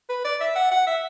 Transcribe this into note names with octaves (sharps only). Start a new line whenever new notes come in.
B4
D5
E5
F#5
F#5
E5